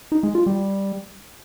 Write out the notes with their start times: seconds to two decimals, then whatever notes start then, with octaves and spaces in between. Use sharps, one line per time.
0.12 D#4
0.23 G#3
0.35 F4
0.46 G3